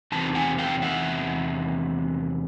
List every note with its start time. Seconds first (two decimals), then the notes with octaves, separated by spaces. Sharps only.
0.12 E2 C3 D#3 A5
0.35 F#5 G#5
0.58 F5 G5
0.82 E5 F#5